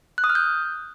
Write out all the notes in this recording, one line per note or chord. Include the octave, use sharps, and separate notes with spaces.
F#6
D#6
F6
G6